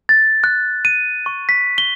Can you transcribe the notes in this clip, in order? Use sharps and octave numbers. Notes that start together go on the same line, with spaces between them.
A6
F#6
D#7
C#6
B6
G7